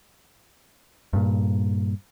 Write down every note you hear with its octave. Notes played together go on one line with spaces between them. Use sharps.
G2 A#2